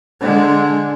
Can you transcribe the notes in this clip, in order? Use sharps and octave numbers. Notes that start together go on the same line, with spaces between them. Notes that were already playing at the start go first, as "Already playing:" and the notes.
D3 G#3